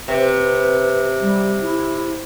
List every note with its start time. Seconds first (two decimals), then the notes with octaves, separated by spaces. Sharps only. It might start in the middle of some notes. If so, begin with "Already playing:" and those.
0.08 C3 B4
1.21 G3
1.62 E4